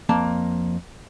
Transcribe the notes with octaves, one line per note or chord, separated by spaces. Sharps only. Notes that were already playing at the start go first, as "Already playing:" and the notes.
F2 A#3 A5